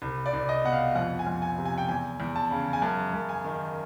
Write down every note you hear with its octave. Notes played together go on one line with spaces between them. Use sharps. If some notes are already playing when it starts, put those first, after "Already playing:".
C2
D5
C2
D#5
B2 F#5
F5
F2 F#5
G#5
F2
G#5
C3
G#5
G5
E2 G#5
E2
A5
C#3
G#5
F#2 A5
F#2
G#5
D#3